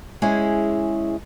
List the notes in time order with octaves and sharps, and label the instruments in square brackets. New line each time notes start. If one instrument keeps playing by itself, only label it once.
[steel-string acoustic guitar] G#3 C#4 E4 G#4